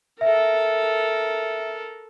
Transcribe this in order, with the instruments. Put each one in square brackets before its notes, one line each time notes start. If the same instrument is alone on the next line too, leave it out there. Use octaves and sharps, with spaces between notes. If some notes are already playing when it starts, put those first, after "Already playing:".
[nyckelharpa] A4 A#4 [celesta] E5